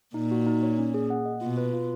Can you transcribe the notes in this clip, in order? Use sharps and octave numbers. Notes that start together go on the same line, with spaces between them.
A#2 D#4
F#4
D#4
C#5
C#4
G#4
F#5
D#5
B2 F4
B4
F4